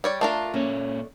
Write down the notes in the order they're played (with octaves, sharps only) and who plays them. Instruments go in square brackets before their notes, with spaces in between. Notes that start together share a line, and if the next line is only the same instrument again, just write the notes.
[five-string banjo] G3 C#5 D5
[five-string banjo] A3 D4 A#4 [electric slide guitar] F4
[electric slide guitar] A#2 C#5 [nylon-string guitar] A#3 C#4